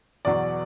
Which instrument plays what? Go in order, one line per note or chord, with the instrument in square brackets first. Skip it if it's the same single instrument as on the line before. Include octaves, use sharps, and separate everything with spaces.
[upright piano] E2 B2 F#3 D5